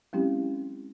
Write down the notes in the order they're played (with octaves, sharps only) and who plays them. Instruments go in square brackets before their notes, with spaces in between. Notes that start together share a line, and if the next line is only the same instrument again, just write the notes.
[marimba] F#3 G#3 C4 C#4 E4 G4